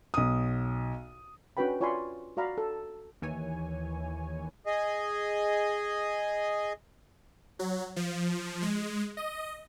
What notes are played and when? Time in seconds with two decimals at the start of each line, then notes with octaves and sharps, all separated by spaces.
0.14 B1 D#6
1.57 C#4 D4 F#4 B4 G5 B5
1.81 F4 C#5 D5 G#5 B5 C6
2.37 F#4 D5 F5 A#5 B5
2.58 A4
3.22 D#2 D#3 E3 C#5 G#5
4.66 G#4 D#5
7.59 F#3
7.96 F3
8.62 G#3
9.17 D#5